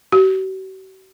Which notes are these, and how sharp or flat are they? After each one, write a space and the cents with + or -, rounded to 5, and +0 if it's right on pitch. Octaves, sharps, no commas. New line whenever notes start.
F#4 +45